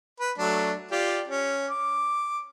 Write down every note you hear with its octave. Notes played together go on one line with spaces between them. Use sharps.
B4
F#3 A3 D4
F4 G4 D5
C#4
D6